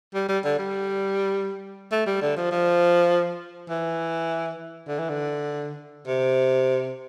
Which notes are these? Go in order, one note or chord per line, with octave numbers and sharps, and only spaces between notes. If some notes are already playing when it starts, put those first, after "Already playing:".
G3
G3
D3
G3
A3
G3
D3
F3
F3
E3
D3
E3
D3
C3